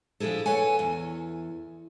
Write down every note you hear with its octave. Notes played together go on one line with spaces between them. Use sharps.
F3 D4 E4 G#4 A4
A4 B4 C#5 F#5 G#5
E2